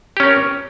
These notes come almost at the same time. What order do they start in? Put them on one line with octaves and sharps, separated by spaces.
G4 C#4 A#4